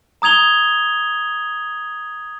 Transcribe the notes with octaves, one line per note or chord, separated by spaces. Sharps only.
A#5 D#6 G#6 F7 G7